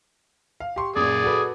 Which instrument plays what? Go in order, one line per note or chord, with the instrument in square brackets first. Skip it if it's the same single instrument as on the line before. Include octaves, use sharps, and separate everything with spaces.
[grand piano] F5
G4 C6 C#6
[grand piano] F#2 A#2 [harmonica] G#4 D5
[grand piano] F#4 A4 B4